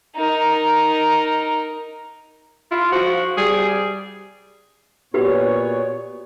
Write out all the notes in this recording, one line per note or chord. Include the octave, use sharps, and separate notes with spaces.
D#4 A#4
E4 F4
F3 F#4
G3 G#4
A#2 B3 F#4 G4 B4 C#5